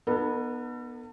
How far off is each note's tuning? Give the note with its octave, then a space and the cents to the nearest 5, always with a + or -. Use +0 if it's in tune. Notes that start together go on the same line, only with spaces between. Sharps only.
B3 -15 D#4 -40 A4 +40